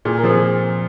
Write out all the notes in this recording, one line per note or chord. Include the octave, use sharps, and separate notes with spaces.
A#2 G#4
A#4
F3 C4
G#4